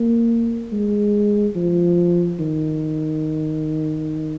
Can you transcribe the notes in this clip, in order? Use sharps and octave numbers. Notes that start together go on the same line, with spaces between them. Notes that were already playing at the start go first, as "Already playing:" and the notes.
Already playing: A#3
G#3
F3
D#3